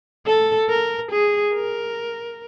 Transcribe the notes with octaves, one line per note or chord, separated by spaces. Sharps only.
A4
A#4
G#4
A#4